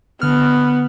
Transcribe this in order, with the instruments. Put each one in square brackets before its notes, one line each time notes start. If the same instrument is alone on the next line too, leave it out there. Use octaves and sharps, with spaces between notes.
[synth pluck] D3 F6 [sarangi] B3